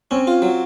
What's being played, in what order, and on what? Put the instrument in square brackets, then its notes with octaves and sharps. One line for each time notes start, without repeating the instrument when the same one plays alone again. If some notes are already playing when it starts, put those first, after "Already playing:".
[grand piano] C4 [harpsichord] C#4
[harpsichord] F4
F#3